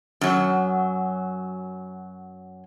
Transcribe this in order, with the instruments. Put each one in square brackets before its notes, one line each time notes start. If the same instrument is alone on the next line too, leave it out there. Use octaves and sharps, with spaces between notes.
[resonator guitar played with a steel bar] F#2 F#3